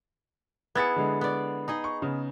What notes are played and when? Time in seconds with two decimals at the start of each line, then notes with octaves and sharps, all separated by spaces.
0.75 B3 E4 G#4 G#6 A6 C#7
0.96 D3 G#3
1.21 B3 D5
1.68 D#4 G#4 D#5
1.84 C#6
2.02 C#3 B3